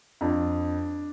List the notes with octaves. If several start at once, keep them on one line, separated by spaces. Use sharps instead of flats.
F2 D4